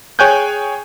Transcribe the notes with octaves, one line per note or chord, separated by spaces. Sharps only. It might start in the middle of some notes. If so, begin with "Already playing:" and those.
G#4 C#5 G5 G#5 F#6 G6